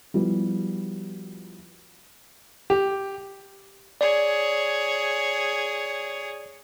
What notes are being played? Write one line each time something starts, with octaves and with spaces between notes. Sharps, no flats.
F3 G3 B3 E4 F#4 G4
G4
G#4 C#5 D5